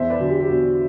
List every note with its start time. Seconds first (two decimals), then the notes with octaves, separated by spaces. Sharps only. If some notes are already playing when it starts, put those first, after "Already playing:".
Already playing: E2 C5 E5
0.10 B4 D5
0.19 D3 F#3
0.29 G4
0.40 G4
0.49 E2 F#4